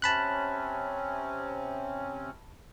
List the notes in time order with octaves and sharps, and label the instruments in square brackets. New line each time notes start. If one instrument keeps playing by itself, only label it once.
[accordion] C3 C4 C#4 [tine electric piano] A5 B5 F#6